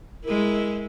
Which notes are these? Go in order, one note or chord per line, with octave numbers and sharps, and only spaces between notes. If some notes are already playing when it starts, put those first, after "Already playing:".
G#3 E4 A#4